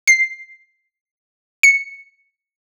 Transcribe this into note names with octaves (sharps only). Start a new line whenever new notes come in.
C7
C#7